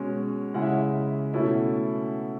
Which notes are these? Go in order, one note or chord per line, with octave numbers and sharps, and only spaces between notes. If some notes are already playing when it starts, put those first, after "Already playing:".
Already playing: B2 G#3 C#4 C#5
C#3 G#3 C#4 E4 F#5
E5
D#5
E5
B2 A3 C#4 E4